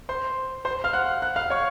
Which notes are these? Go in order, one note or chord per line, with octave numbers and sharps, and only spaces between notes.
C5 C6
C5 C6
F5 F6
F#5 F#6
F#5 F#6
F5 F6
C#5 C#6